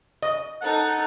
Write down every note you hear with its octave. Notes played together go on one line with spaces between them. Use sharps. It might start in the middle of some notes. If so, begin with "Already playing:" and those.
D#5
D#4 A4 F#5